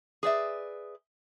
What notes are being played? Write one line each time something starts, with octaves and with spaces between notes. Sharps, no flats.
G#4 B4 D5 E5